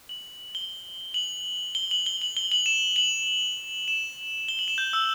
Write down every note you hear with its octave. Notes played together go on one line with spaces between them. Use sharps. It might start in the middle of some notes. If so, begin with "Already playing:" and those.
F#7
G7
F#7
G7
F#7
G7
F#7
G7
F#7
E7
F#7
E7
G7
F#7
E7
G6
E6